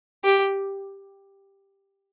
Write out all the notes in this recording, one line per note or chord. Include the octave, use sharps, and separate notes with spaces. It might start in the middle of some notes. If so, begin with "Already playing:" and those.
G4